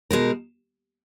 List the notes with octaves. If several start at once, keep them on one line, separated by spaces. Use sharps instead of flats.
B2 G#3 D#4 A#4